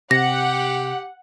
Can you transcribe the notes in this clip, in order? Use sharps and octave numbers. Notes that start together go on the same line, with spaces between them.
C3 G4 F#5 A#6